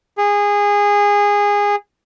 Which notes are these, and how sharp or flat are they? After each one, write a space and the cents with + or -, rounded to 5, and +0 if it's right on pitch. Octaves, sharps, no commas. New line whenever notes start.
G#4 -20